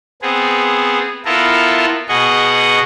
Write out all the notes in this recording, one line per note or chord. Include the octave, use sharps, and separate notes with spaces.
B3 C4 G#4
B3 E4 F4 A4 A#4
B2 G#4 D#5 F#5 C#6